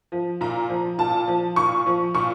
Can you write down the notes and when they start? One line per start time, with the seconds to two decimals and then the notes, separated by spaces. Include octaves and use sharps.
0.12 F3
0.41 A#2 A#5
0.69 F3
0.98 A#2 A5
1.28 F3
1.56 A#2 C#6
1.86 F3
2.14 A#2 C#6